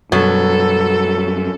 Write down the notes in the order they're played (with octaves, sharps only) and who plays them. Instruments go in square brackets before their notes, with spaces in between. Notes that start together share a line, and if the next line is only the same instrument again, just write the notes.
[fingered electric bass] F#2 G3 [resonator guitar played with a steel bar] B2 F#3 [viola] A4